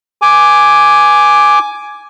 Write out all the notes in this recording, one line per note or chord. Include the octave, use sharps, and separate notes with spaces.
G#5 D6